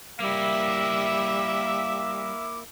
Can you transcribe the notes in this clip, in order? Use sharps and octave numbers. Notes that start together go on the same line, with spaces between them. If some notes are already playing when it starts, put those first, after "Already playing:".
G3 A#3 E4 E5 D6